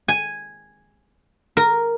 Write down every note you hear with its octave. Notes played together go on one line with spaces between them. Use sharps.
G#5
A#4